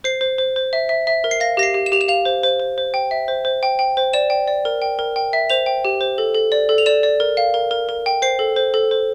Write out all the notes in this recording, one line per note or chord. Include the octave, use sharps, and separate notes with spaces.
C5 C7
C5
C5
C5
E5
E5
E5
A#4
C7
F5 A#6
G4 A#6
C7
G4
E7
G4 F7
E7
F5 F7
C5
C5
C5
C5
G5
E5
C5
C5
G5
G5
C5
D5 E7
G5
D5
A#4
G5
A#4
G5
E5
C5 F7
G5
G4
C5
A4
A4
D5
A4
F7
D5 E7
D5
A#4
F5
A#4
A#4
A#4
G5
C5 C7
A4
C5
A4
C5